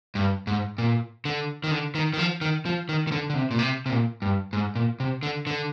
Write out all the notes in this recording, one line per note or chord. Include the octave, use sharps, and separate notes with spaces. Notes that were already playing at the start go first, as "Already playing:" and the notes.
G2
G#2
A#2
D3
D#3
D3
D#3
D#3
F3
D#3
F3
D#3
D#3
D3
D3
C3
A#2
C3
C3
A#2
G2
G#2
A#2
C3
D3
D3